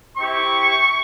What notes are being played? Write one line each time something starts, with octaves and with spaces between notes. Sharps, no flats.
C4 E4 G4 C#6